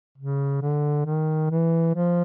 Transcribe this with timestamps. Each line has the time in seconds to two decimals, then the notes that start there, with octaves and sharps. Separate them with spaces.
0.18 C#3
0.62 D3
1.06 D#3
1.50 E3
1.95 F3